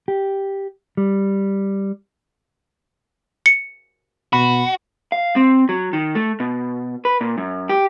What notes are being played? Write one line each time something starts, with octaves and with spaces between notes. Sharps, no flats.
G4
G3
C#7
B2 F#4 B5
F5
C4
F#3
D#3
A3
B2
B4
A#2
F#2
G4